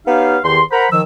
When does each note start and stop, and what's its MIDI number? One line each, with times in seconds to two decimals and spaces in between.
0.07 0.38 59
0.07 0.38 63
0.07 0.38 67
0.07 0.38 73
0.07 0.38 77
0.44 0.61 40
0.44 0.61 51
0.44 0.61 67
0.44 0.61 84
0.71 0.86 70
0.71 0.86 72
0.71 0.86 78
0.71 0.86 82
0.71 0.86 83
0.91 1.02 51
0.91 1.02 53
0.91 1.02 88